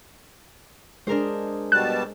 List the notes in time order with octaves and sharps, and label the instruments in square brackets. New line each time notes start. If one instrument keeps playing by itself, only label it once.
[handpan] G#3 G#4 [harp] D4 A#4 C5
[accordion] B2 G3 A5 [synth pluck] F#6